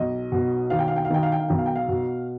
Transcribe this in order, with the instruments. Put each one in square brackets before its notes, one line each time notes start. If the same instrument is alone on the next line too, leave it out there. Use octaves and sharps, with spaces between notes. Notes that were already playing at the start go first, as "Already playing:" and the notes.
Already playing: [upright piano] B1 D#5
B2
D#2 F5
G5
F5
G5
F5
D#3 G5
F5
G5
F5
B1 G5
F5
G5
F5
B2